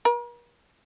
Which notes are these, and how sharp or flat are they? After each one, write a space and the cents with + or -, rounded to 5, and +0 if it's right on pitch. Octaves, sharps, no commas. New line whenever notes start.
A#4 +45